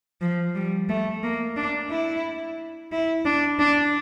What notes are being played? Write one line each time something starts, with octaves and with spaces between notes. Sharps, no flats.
F3
G3
A3
A#3
D4
E4
E4
D4
D4